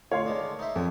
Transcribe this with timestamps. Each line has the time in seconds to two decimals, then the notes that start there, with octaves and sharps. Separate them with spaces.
0.12 D2 C#5 F5 C6
0.26 D#3 G#3 D4
0.59 D#4 C5 E5
0.76 F2 F3 C#5